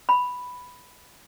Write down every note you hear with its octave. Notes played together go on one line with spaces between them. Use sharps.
B5